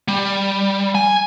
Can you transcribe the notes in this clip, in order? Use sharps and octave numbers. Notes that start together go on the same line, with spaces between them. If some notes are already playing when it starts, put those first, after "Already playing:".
G3
G#5